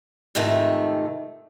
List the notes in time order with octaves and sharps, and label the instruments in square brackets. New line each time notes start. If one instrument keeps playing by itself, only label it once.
[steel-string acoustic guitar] F2 G#2 C3 D#3 A3